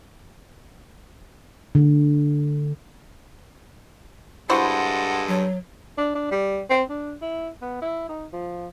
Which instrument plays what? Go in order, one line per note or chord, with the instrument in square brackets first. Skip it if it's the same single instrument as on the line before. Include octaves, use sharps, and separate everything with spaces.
[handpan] D3
[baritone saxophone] G2 [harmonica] G#3 A4 [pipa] E4 F#4 C5 [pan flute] F#5
[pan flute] F#3
[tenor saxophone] D4
D4
G3
C4
D4
E4
B3
E4
D#4
F3